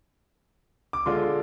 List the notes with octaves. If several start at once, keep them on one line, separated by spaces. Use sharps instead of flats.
D6
D3 G#3 D4 F4 C6